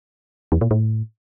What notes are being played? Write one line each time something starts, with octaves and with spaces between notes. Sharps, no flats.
E2
A#2
A2